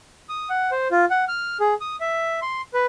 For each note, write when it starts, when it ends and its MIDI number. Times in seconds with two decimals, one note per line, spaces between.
0.29 0.49 87
0.50 0.71 78
0.72 0.88 72
0.91 1.05 65
1.10 1.24 78
1.28 1.57 89
1.60 1.74 68
1.81 1.96 87
2.00 2.40 76
2.42 2.62 84
2.74 2.86 71